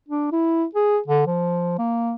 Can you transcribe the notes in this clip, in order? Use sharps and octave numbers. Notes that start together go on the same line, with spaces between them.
D4
E4
G#4
D3
F3
A#3